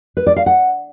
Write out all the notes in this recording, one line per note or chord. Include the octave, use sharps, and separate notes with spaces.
B4
D5
F5
F#5